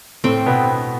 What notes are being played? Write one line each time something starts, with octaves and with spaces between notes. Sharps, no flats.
A2 A3 C4
B2 B3